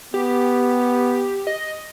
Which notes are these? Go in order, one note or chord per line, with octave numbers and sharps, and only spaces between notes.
B3 G4
D#5